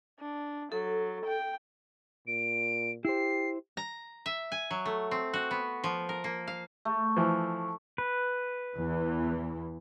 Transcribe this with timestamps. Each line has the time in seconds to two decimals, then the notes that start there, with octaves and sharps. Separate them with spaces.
0.20 D4
0.72 F#3 A4
1.25 G5
2.27 A#2 D7
3.05 E4 G4 C5 C7
3.77 A#5
4.26 E5
4.52 G#5
4.71 F#3
4.86 A3
5.11 C4
5.34 F#4
5.51 B3
5.84 F3
6.09 A#4
6.24 A#3
6.47 F5
6.85 A3
7.17 E3 F3
7.98 B4
8.75 E2 E3